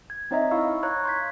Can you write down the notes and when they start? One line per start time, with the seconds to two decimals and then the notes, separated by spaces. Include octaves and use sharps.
0.10 G#6
0.31 C4 D#4 C#5 D#5 E5 A#5
0.51 E4 F5 C#6 E6
0.83 C#5 F5 A#5 C#6 F#6 G#6
1.05 C6 G6 G#6 B6